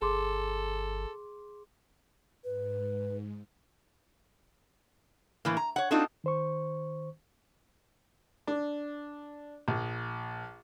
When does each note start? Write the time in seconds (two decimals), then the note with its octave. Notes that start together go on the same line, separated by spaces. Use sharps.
0.02 G1 G#4 A4 C6 D6
2.44 G#2 B4
5.45 A2 E3 A#3
5.57 A#5
5.76 C#5 F#5
5.91 C4 D4 D#4 F4 F#4 A4
6.24 D#3 C5 C#6
8.47 D4
9.68 A#1